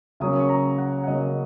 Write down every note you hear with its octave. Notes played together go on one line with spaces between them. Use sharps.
C#3 F#3 A#3 C#4 D#6
C#6
A#5
F#5
F#5
C#3 F#3 A#3 C#4 D#5